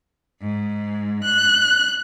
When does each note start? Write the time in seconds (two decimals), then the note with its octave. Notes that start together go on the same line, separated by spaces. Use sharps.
0.42 G#2
1.24 F#6